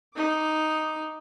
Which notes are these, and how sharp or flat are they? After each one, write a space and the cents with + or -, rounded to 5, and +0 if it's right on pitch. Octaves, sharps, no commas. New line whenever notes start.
D#4 +0 D6 +0